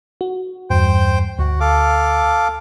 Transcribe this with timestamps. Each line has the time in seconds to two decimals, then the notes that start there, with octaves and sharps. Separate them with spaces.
0.21 F#4
0.70 E2 G2 C5 G5
1.39 D2 F#4
1.60 A4 F5 D6